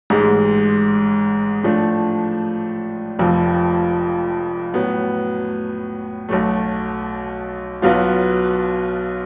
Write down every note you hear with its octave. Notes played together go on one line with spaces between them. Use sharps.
A1 G#2 G#3
A2 F3 A3 D4
F1 F2 F3
A2 F#3 B3
B1 B2 F#3 A3
B1 B2 F#3 B3 F4